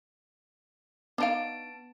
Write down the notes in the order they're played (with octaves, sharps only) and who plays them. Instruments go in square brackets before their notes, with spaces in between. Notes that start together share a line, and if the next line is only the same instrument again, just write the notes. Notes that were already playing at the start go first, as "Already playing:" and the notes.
[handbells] B3 A5 D7 [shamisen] D4 D#4 F5